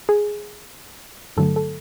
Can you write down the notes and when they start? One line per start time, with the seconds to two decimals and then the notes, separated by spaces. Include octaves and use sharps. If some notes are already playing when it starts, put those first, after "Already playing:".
0.09 G#4
1.37 G2 D3 F#3 A3 A4
1.56 A4